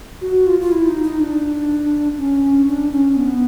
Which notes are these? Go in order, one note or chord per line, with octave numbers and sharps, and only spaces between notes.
F#4
F4
F4
E4
D#4
D#4
D4
C#4
D4
C#4
B3